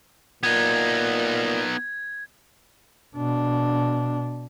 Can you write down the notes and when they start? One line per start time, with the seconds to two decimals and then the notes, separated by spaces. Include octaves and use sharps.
0.43 A#2 B3 D#4 G#6
3.17 B2 D4